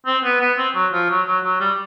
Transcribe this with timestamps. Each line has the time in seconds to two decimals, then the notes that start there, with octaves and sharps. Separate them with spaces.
0.06 C4
0.24 B3
0.41 B3
0.58 C4
0.75 F#3
0.93 F3
1.10 F#3
1.27 F#3
1.44 F#3
1.61 G3